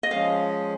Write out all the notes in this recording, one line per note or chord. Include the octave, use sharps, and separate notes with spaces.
D#5
F3 G#3 C#4 G#4 F5